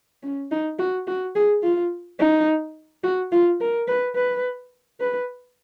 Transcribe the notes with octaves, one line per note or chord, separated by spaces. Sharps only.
C#4
D#4
F#4
F#4
G#4
F4
D#4
F#4
F4
A#4
B4
B4
B4